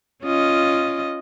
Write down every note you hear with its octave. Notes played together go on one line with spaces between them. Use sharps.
C#4 F4 D#5